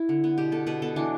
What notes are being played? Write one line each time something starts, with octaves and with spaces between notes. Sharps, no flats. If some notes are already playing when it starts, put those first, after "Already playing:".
Already playing: E4
D3
B3
B2 G4
B3 A4
B2 B4
B3 A4
E3 D4